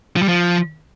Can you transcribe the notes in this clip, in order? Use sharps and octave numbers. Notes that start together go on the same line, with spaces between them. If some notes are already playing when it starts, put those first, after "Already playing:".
F3
G3
F3